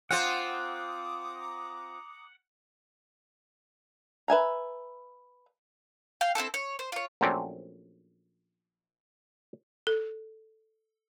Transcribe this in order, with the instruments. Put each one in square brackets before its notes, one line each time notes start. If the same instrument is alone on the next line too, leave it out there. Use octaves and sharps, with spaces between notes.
[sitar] C4 F4 C5 [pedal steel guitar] F#5 [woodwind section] A#5 D6 D#6
[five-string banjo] B4 E5 G#5 A#5
[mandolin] F5 G5
C4 D#4 E4 A4
C#5
C5
F4 C#5
[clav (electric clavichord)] A#1 F#3 A3 C4 C#4 D5
[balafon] A4